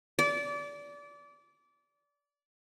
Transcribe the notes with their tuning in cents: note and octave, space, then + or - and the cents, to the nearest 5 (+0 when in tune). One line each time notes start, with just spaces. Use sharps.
D5 -25